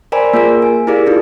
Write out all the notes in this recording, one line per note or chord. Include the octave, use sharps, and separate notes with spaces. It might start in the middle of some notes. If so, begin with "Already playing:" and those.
A#4 C5 D5 G5 G#5 B5
A#3 F4 G#4 A#4
G#5
E4 G4 G#4 A#4 D5 F5
D#4 F4 A4